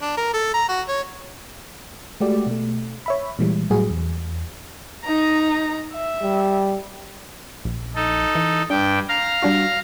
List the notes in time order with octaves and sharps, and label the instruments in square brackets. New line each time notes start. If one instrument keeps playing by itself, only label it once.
[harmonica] D4
A#4
A4
A#5
F#4
C#5
[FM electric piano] G#3 A3 F#4 G4 D5
B2 A3
C#5 E5 B5
A#2 E3 G3 G#3
A2 F#3 G3 F#4 G#4
E2
[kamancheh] D#4 A#5
E5
[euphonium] G3
[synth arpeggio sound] A#1
[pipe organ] D#4 A4
[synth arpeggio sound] E3
[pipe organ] G2 G5 [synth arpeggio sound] D4
[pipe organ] F5 A#5
[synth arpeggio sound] G3 D4 F#4